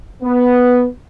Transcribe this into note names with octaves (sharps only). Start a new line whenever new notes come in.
B3